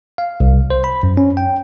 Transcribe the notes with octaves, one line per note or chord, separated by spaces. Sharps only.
F5
C2
C5
B5
F#2
C#4
G5